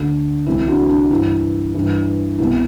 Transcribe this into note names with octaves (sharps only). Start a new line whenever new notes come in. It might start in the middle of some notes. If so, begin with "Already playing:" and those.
Already playing: D2 D3 D4
C2 C3 E3 E4
D4 F#4
D4
G2 E3 E4
G2 E3
C2 B2 E4